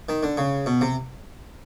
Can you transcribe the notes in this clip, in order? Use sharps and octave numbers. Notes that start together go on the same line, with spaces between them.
D#3
D3
C#3
B2
C3